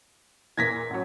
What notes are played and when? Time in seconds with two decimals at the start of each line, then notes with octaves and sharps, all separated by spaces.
0.57 E2 A#2 E3 G#6 A#6 B6
0.90 A1 F#3